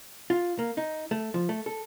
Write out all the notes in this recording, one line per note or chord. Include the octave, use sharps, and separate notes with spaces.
F4
A#3
D#4
A3
F3
A3
A4